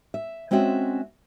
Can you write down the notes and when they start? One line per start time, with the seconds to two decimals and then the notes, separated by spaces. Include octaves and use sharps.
0.14 E5
0.51 G#3 C4 C#4 F#4 E5